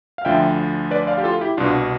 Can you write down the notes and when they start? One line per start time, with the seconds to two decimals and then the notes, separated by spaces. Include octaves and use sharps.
0.18 F5
0.25 D2 D3 F3 E5 G5
0.91 B4 D5
1.07 D5 F5
1.18 G4
1.24 F4 A4
1.41 E4 G4
1.57 C2 B2 D4 F4